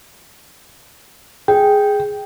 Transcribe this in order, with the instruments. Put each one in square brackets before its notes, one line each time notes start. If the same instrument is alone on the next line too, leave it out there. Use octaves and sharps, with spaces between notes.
[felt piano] G#4 [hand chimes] G5